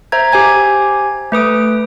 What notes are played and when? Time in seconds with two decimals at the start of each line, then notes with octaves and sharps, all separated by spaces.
0.12 C5 E5 A#5 G#6
0.32 G4 C5 G#5 G#6
1.32 A3 B4 D#6 D7